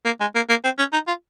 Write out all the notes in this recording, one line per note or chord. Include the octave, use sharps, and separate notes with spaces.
A#3
G#3
A#3
A#3
C4
C#4
D#4
F4